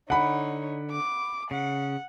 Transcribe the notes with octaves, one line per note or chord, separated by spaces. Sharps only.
D3 D#4 C#5 F#5 B5
D6
C#3 F#5